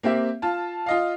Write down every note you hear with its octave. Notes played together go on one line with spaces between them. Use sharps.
A#3 C4 G4 E5
F4 A5
F4 D#5 F5